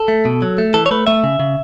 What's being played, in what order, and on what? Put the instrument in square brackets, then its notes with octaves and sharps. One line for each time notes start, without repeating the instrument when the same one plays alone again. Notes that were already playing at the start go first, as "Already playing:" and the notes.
Already playing: [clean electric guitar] A4
A3
B2
F#3
A3
E3 A4
C#5
A3 B4
A3 E5
C#3
C#3